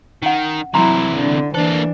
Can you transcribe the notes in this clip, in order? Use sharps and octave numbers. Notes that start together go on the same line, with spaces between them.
D#3 C#4 F#5
C3 E3 F#3 E4 A#5 C6
D3
E3 A#3 D4 A4 C5